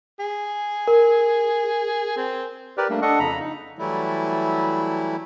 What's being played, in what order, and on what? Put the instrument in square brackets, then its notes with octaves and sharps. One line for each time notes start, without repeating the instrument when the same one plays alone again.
[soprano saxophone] G#4
[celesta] A#4
[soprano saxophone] C4
[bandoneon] G4 A#4 B4 D5
G3 A3 A#3 D4
D4 A4 D#5 F#5 C#6
F2 C#3 A#5 B5
D#4
[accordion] E3 F#3 G3 A3 E4